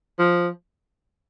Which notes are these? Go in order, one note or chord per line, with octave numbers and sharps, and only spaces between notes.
F3